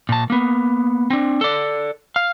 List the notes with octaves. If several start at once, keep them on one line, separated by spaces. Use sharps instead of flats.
A#2 A5
A#3 B3
C4 D4
A4 D5
F5